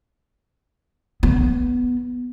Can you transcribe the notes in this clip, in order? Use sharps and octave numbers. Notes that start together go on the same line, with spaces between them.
B3